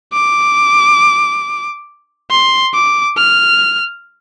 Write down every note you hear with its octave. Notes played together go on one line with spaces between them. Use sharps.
D6
C6
D6
F6